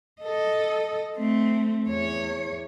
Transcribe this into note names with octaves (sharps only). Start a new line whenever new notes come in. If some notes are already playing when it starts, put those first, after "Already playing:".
A4 D#5
A3 C4
E2 C#5